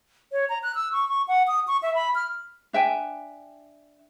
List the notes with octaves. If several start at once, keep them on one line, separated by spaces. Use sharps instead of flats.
C#5
A#5
F#6
E6
C#6
C#6
F#5
D#6
C#6
E5
B5
F6
D4 E5 G5 G#5